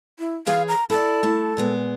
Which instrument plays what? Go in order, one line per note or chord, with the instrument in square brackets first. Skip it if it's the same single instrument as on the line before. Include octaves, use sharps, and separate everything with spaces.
[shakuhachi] E4
[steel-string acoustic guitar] E3 G#4 C#5 [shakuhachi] F5
[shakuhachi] A#5
[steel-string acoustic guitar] E4 D5 [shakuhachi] A4
[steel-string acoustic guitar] A3 E4 A5
A#2 G#3 B3